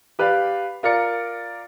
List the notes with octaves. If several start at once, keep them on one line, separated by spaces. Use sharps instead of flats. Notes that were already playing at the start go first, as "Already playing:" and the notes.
G4 B4 D5 F5
F4 A#4 D5 C#7